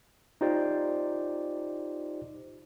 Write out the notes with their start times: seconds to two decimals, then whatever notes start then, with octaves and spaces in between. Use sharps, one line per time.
0.41 D#4 F4 G4 C5 D5